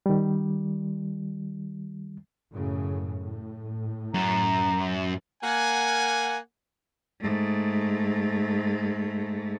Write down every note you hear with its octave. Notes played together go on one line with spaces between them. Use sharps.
D#3 G3
F#2 A2 C#3
A2
F#2 A#5
A#3 F#5 G#5
G#2 A3